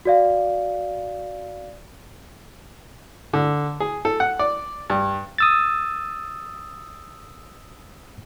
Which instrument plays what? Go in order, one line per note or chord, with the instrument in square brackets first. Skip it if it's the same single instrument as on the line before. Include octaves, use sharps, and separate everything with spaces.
[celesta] F#4 D5 F5
[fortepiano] D3
G#4
A4
F#5
D5
G2
[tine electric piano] D#6 E6 A6